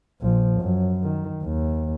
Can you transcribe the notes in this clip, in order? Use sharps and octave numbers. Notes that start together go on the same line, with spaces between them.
A#1 F3
F#2
D#3
D#2